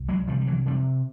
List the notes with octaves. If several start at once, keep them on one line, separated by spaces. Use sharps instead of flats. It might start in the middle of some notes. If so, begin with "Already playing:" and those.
Already playing: C2
F#3 G#3
C3 F3 G3
G3
E3 F#3
C3 F3 G3